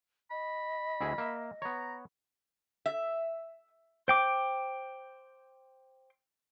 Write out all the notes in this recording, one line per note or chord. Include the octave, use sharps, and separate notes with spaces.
D#5 B5
D2 E4 G#4
A#3 E5
B3 C#5 A#5
E5
C5 G5 D6